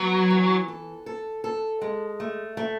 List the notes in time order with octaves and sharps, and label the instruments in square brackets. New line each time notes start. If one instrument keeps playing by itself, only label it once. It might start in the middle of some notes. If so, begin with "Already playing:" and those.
Already playing: [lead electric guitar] F#3 [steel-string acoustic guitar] B3
[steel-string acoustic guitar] E3
A4
A4
A4
G#3
A3
A3